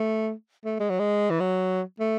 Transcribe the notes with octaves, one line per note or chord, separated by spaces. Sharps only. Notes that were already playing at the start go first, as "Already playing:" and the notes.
Already playing: A3
A3
G#3
F#3
G#3
E3
F#3
A3